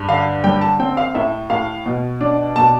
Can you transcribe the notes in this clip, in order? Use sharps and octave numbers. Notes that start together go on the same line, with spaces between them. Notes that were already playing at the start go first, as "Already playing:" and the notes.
Already playing: G2
D3 F5
G3 G5
A5
C4 G5
F5
A2 E5
A2 F5
B2
D4
B2 A5